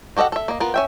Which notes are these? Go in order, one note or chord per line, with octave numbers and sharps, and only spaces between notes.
F#4 G4 A4 D#5 F#5
A4 E5
A#3 D#5
B3 F4 A#4
C#4 E5 G5